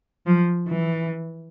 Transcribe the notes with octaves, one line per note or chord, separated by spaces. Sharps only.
F3
E3